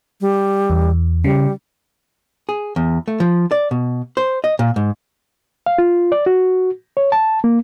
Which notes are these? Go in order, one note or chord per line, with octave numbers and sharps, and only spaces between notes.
G3
E2
C#3 G3
G#4
E2
A3
F3
D5
B2
C5
D#5
A#2
G#2
F5
F4
D5
F#4
C#5
A5
A#3